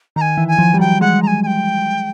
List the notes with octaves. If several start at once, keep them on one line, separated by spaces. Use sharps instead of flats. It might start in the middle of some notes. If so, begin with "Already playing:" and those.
D#3 A#5
G#5
E3
G#5
F3
G3
F#3 G5
G#3 F#5
A#5
G#5
G#5
G5